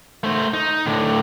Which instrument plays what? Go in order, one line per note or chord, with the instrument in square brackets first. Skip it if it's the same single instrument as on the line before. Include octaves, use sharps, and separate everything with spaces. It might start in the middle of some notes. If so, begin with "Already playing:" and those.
[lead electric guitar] A3 C5
D#4
A2 D3